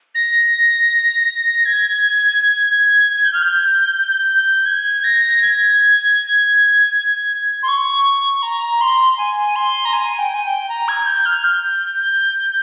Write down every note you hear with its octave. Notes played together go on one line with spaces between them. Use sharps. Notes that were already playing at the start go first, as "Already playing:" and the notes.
A#6
G#6
G#6
G6
F6
G6
G#6
A#6
G#6
C6
C#6
A#5
C6
G#5
C6
A#5
G#5
G5
G#5
G5
A#5
G#6
G6
F6
G6